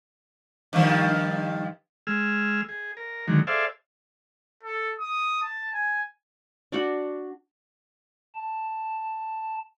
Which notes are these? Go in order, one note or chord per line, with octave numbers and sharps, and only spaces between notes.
G2 D#3 F3
G#3 G#4 E6 F6
G#4
A#4
D3 D#3 F#3 G#3
G#4 A4 C5 D5 E5 F5
A4
D#6
A5
G#5
D4 F#4 F#5
A5